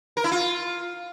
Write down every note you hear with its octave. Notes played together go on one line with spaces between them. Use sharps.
A#4
E4
F4